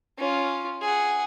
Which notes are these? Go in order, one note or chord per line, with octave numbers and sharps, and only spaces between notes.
C#4 F4
G#4 F#5